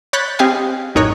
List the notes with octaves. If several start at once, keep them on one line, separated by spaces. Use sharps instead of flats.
C#5 B5 F#6 G6 A6 B6
C4 G4 G#4 D#5 F5 G#5
A1 F#2 D#4 A#4 C#5 F#6